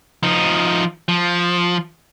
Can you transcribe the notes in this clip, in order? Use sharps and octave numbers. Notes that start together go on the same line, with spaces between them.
F3 D#4
F3